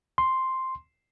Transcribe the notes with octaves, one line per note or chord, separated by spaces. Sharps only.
C6